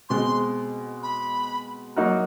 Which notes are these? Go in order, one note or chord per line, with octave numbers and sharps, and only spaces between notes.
B2 G#3 C4 C6
B5
F#3 A#3 D#4 F#4 A#4